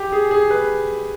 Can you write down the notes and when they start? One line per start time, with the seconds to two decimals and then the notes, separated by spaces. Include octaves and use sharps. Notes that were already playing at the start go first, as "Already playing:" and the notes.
Already playing: G4
0.12 G#4
0.31 G#4
0.50 B4